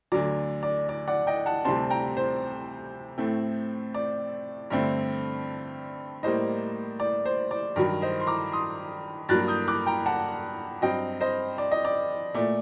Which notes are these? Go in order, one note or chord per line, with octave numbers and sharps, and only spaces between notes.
D2 D3 F#3 D5
D5
D5
D5 F#5
D#5 G5
F#5 A5
D2 C3 G3 C4 A5 C6
G5 A#5
C5
A2 A3 C4
D5
G2 D3 A3 C4
A2 G3 A#3 C5 D#5
D5
C5
D5
G2 D#3 F#3
C5 D#5
C6
A#5 D6
C6 D#6
G2 F#3 A#3 F#6 A6
D#6 G6
D6 F#6
G5 A#5
F#5 A5
G2 F#3 C4 D#5 G5
C5 D#5
D5
D#5
D5
A#2 A3 D5